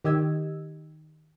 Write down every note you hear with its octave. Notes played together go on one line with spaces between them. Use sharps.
D#3 G4 D#5 E6 G#6